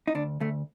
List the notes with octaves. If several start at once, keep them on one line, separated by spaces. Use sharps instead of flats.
D#4
D2 D4
D2 A3